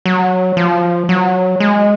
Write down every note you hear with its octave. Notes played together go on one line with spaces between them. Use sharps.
F#3
F3
F#3
G#3